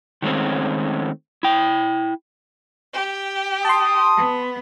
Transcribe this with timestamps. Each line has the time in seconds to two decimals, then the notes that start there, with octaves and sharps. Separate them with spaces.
0.22 D#3 G#3 A3 C4 C#4
1.43 E4 G5
2.94 G4
3.65 A5 C6 D#6
4.16 B3